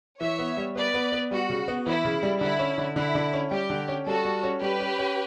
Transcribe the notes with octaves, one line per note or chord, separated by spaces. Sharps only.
E3 C#5 E5
B3
G3
B3 B4 D5
B3
B3
G3 F#4
C#3
B3
E3 E4
C#3
G3
D3 E4
C#4
D3
D3 E4
D3
C#4
G3 G4
D3
C#4
G3 F#4 A4
G3
C#4
G3 G4 B4
C#4
C#4